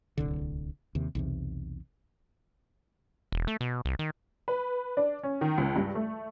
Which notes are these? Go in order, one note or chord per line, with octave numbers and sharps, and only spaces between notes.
D1 C2 D3
D#2 C3
B1 E2 C3
E1
A3
B2
C2
D#3
B4
D4
C#4
D#3
C#2
G2
A3